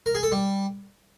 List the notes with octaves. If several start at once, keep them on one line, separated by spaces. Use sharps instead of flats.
A#4
G#4
A4
G3